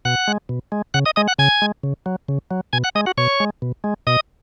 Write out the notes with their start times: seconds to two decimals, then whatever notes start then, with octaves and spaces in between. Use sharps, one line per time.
0.05 B2 F#5 F#6
0.28 G#3
0.49 B2
0.72 G#3
0.94 C#3 F#5 F#6
1.06 D#5 D#6
1.16 G#3 D#5 D#6
1.28 F#5 F#6
1.38 C#3 G#5 G#6
1.62 G#3
1.83 C#3
2.06 F#3
2.29 C#3
2.51 F#3
2.73 B2 G#5 G#6
2.84 F#5 F#6
2.95 G#3 D#5 D#6
3.06 F#4 F#5
3.18 B2 C#5 C#6
3.40 G#3
3.62 B2
3.84 G#3
4.07 B2 D#5 D#6